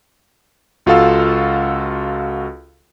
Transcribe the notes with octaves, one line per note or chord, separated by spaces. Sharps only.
C#2 F4 F#4 A4 F5 E6